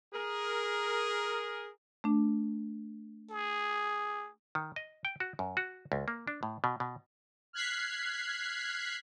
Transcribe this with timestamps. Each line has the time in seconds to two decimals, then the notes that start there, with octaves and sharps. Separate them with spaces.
0.14 G#4 A#4
2.04 A3 D4
3.30 G#4
4.55 D#3
4.76 D#5
5.05 G5
5.20 F#4
5.39 F#2
5.57 F#4
5.92 C#2
6.08 A#3
6.28 D4
6.43 A2
6.64 B2
6.80 B2
7.53 F6 F#6 G#6 B6 C7